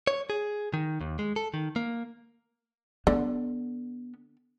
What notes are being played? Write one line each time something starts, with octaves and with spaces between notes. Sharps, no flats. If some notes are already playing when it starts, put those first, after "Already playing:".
C#5
G#4
D#3
D#2
G#3
A4
D#3
A#3
D3 B3